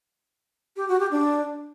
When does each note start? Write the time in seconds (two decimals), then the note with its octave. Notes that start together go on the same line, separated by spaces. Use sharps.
0.77 G4
0.88 F#4
1.00 G4
1.11 D4